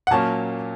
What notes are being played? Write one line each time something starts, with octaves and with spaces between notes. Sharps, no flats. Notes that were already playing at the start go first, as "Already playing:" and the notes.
F#5
A#2 F#3 A#3 C#4 A5